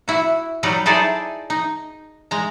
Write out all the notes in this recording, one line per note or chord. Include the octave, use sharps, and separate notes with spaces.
E4 F#4
F#3 G3 D#4 F#4 G4
D#4 E4 G#4 A4 C5 D5
D#4
G#3 A#5